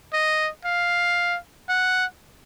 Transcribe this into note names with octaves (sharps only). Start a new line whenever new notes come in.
D#5
F5
F#5